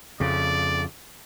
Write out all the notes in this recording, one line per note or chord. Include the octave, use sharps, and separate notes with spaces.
F2 C#3 D5